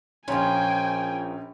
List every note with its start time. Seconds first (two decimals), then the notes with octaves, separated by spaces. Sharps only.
0.28 A#1 A#2 F3 C#4 G5 G#5